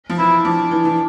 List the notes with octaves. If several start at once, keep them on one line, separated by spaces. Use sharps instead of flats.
F3
E3 E4
F3 D4
E3
E3